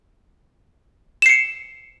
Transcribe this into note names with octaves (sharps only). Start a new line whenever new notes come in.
C7 C#7 E7